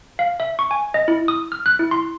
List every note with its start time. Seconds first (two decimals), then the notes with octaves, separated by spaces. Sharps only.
0.19 F5
0.40 E5
0.59 C#6
0.71 G#5
0.94 D#5
1.08 E4
1.28 D#6
1.52 F6
1.66 F#6
1.79 E4
1.91 C6